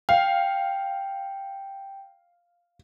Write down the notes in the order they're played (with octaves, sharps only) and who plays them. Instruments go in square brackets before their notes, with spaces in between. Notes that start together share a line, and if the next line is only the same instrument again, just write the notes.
[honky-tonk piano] F5 [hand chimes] G5